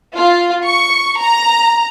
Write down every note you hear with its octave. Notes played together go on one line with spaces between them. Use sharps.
F4
C#6
A#5